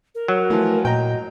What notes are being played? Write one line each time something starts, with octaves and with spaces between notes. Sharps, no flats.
A#4
F#3
E3 F3 A3
A#2 D#5 G5 A#5